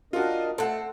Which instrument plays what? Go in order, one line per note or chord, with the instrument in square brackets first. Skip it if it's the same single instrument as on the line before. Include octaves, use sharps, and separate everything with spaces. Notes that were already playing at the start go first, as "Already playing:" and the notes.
[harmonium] D4 A#4 D#5 [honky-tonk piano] F4 F#4
[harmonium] A3 [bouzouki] C4 F#5 [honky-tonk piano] A4